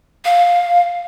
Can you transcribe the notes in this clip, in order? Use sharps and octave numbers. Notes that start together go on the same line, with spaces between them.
F5